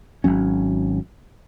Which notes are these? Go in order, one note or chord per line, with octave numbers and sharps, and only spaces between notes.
G#1 F#2 F#3 C#4